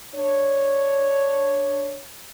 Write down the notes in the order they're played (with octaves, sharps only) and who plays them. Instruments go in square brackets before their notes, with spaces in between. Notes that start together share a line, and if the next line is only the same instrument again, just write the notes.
[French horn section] D4 C#5